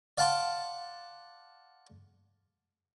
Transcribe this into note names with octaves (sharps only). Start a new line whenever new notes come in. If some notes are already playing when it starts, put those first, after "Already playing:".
D5 F5 F#5 A5 C6 D6